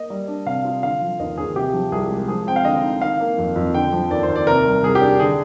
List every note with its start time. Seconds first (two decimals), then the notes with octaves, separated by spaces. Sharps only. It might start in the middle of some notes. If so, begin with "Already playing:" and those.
Already playing: A#3 D#5
0.10 G3
0.28 D4
0.46 C3 F5
0.65 F4
0.83 D3 F5
1.01 F3
1.19 D#2 D#5
1.38 D#2 G#4
1.56 C3 G4
1.73 F3
1.92 C2 G#4
2.10 G#3
2.28 F3 G#4
2.47 C4 G5
2.56 F5
2.65 D3 D#5
2.83 D#4
3.01 D#3 F5
3.20 A#3
3.38 F2
3.56 F2
3.74 D3 G5
3.93 F3
4.11 D#2 D5
4.23 C5
4.28 D#2
4.35 D5
4.46 C3 A#4
4.66 G3
4.83 C2 G#4
4.95 G4
5.02 D4
5.20 D3 G#4